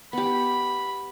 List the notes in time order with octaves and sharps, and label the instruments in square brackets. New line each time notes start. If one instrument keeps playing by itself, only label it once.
[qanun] B3 G4 [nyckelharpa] B5